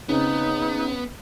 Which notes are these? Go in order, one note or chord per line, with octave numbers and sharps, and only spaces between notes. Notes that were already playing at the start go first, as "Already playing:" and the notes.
C#3 B3 C4 D#4